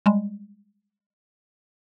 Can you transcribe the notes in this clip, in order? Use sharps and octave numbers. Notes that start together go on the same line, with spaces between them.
G3 G#3